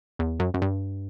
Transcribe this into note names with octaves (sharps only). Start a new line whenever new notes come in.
E2
F#2
F#2
G2